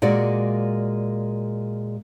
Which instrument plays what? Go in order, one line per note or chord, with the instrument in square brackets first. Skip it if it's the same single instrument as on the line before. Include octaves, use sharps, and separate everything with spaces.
[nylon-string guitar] A#2 G#3 A#3 F#4 D5